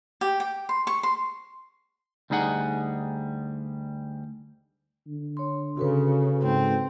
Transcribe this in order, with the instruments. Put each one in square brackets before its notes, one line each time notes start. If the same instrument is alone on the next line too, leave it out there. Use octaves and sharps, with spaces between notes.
[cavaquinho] G4
G5
C6
C#6
C6
[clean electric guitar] D2 G3 D#4 G#4 F#5
[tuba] D3
[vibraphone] C#5 C6
[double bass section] C#3 [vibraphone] F#4 A4 B4
[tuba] G#2 [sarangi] C4